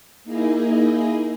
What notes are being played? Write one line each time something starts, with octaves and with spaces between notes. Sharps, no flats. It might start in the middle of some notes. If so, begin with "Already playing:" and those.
A#3 D#4 E4 G#4 D#5